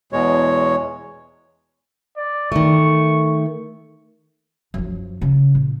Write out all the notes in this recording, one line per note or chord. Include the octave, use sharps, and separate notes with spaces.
E2 B2 G#3 C#5
D5
D#3 A3 C#6
F#2 F3
C#3
A#2